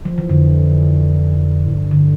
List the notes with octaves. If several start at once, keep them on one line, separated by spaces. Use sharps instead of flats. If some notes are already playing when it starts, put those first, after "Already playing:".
F3
E3
F2 D3
A2
G2
D3